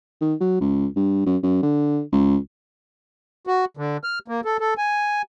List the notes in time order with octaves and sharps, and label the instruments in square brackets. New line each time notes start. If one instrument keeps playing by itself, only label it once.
[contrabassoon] D#3
F#3
C#2
G2
F#2
F#2
D3
C#2
[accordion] F#4
D3
F6
A#3
A4
A4
G#5